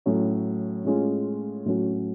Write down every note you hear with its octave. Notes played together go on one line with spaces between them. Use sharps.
A2 F#3 C#4
A2 G#3 C#4 F4
A2 F#3 C#4 F#4